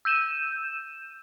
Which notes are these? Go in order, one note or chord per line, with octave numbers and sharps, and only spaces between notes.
E6 G6 D#7 E7